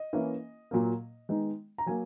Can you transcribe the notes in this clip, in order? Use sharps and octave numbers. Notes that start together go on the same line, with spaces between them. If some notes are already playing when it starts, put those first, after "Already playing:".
Already playing: D#5
E3 A#3 C#4 E4
A#2 F#3 A#3
D#3 G#3 B3 D#4
A#5
F#3 A#3 G#5